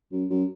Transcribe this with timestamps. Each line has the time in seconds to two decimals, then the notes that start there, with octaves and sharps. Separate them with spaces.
0.12 F#2
0.30 F#2